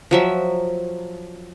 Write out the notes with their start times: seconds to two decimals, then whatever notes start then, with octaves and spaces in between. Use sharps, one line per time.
0.11 F3 F#3 E5